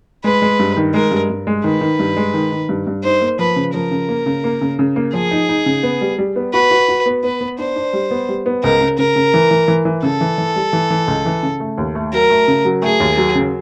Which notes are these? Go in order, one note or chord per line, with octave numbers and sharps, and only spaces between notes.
G#3 B4
G#3
G2
D#3
G#3 A#4
G2
G2
G#3
D#3 B4
D#3
G2
G#3
D#3
D#3
G2
G2
D#4 C5
A#3
F3 B4
C#3
F3 A#4
C#3
A#3
C#3
A#3
C#3
C#3
A#3
F3 G#4
D#4
D#4
C#3
B3
G3
G3
B3
F#4 B4
F#4
F#4
B3
B3 B4
B3
D4 C5
D4
G3
B3
G3
B3
C#2 A#4
C#3
C#3 A#4
C#3
E3
E3
E3
E3
C#3 A4
E3
E3
G3
E3
E3
C#2
E3
C#3
A3
D#2
A3
F#3 A#4
A3
C#3
F#3
A3 G#4
D#2
F#3
C#3